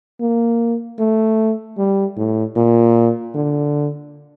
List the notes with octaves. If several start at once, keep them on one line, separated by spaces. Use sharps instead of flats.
A#3
A3
G3
A2
A#2
D3